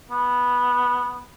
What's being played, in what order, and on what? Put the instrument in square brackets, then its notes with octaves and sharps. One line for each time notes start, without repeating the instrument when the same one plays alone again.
[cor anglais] B3